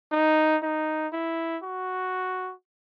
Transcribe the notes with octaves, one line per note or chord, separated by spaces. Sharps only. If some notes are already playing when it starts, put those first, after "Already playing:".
D#4
D#4
E4
F#4